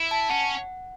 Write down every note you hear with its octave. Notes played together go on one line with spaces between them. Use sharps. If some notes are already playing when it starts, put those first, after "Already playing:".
Already playing: E4
A5
C#4 F#5